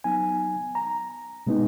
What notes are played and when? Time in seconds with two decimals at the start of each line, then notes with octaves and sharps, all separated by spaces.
0.04 F#3 B3 D#4 G#5
0.75 A#5
1.47 B2 G#3 B3 D#4